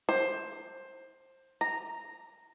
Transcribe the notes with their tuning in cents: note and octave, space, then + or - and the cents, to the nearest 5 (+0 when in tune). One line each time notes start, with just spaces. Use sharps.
C5 +15
A#5 -5